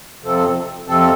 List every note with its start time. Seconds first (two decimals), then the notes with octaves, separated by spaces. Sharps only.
0.22 F2 C3 F3 C4 A4
0.87 F2 C3 F3 C4 A4